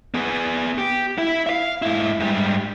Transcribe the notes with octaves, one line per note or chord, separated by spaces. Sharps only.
B3 G#4
G4
E4
E5 F5
G#2 E4
G#2 G3